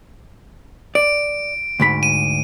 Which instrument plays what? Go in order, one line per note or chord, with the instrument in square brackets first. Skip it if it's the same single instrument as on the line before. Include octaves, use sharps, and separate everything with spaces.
[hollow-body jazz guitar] D5 [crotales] D7
[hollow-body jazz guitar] D2 G#2 B5
[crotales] D#7